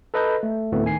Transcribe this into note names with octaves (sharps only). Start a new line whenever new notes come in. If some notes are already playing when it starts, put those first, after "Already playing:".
A4 B4 D#5 A#5 B5 G6
A3
D2 A2 A3 B3 C4
D#3 G#5 C7